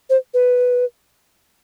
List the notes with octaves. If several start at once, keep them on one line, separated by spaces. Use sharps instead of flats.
C5
B4